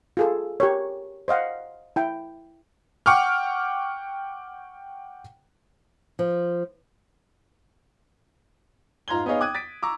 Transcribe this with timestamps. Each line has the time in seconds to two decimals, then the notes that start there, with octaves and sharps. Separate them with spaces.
0.17 F4 G#4 A4
0.60 G4 A#4 C#5
1.28 C5 D#5 F5 F#5
1.96 E4 G5
3.06 F#5 G5 C#6 D6 F6
6.19 F3
9.08 G#2 F4 A#5 C6 G#6 G7
9.26 B3 D#4 G#4 C#5 D#5 F5
9.40 G5 D6 D#6 F#6 G#6 D#7
9.55 A6 B6 D7
9.83 A#5 C#6 D6 E6